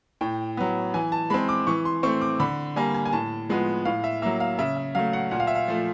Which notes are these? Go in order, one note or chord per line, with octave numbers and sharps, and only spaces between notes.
A2 G5
F#3 B3
E3 G#5
A5
G#3 C4 B5
D6
E3 C#6
C6
A3 C4 C#6
D6
D3 B5
G3 A#3 G#5
G#5
G#5
A2 A5
F3 G#3 B3
A2 F5
E5
F#3 A#3 E5
F5
C#3 E5
E5
F#3 A3 F5
F#5
A#2 F#5
F5
E5
F5
F3 A3